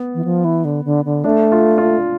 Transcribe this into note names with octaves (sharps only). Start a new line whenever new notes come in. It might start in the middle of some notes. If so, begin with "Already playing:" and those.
Already playing: B3
E3
F3
E3
D3
D3
D3
A3 D4
F4
F4